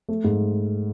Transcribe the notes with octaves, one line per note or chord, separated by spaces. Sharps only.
A3
G#2